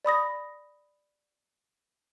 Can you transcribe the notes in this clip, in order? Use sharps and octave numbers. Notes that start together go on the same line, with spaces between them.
D5 B5 D#6 A#6